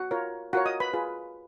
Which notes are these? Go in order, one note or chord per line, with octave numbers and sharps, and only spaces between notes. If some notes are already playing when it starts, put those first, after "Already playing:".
Already playing: F#4 F#5
F4 A#4 C#5
F4 F#4 A#4 C#5 F#5
D#5 D#6
B4 B5
F4 G#4 B4